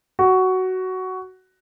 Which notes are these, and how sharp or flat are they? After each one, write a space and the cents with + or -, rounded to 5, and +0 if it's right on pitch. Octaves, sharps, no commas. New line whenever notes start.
F#4 +10